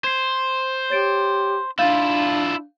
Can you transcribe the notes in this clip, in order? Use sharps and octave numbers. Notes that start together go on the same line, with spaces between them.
C5 G#6 C7
G4 C#5 A6 D7
D4 E4 F4 F5 G6 A6